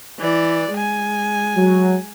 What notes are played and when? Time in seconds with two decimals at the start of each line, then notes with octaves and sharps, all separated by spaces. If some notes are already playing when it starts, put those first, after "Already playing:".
0.19 E3 D5
0.73 G#3 G#5
1.56 F#3